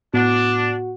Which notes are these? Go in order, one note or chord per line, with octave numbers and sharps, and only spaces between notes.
A2 B3 D4 F#4 F#5